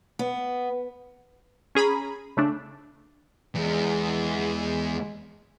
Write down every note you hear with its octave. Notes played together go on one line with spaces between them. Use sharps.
B3
C#4 G#4 A#5 B5
C#3 A3 D4
E2 G#3